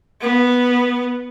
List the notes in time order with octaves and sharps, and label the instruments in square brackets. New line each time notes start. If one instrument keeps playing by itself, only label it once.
[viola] B3